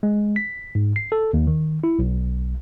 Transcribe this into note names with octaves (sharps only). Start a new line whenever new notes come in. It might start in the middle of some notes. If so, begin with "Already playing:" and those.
G#3
B6
G#2
C7
A4
D#2
D#3
E4
B1